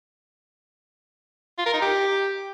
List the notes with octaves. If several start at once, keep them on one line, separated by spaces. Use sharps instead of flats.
F4
A#4
D#4
G4